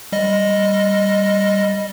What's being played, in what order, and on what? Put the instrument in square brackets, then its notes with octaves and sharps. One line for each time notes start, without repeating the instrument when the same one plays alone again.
[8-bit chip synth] G3 D#5